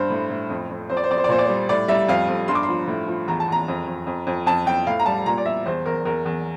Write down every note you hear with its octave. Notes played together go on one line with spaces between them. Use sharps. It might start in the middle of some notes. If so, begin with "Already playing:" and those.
Already playing: G2 C5
A2
A2
F2
F2
F2 C5
D5
C5
F2 D5
C5
D5
A#2 C5
D5
G3 C5
A2 D5
G3 E5
F2 F5
F2
G2 C6
D6
C6
F3
A2
F3
E2 A#5
A5
E2 A#5
F2
F2
F2
F2
F2 A5
F2 G5
A2 F5
A#5
G3 A5
A#2 A#5
D5
G3 E5
E2 C5
E2 A#4
E2 A#4
E2